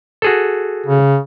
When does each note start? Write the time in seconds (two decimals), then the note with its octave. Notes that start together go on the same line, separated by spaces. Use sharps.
0.22 F#4 G#4 A4
0.86 C#3